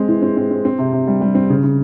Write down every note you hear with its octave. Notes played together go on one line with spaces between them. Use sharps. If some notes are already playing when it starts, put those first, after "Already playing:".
Already playing: G#3 C4
E3
C4
C4
C4
C4
C3
C3
G3
G3
C4
C#3
C#3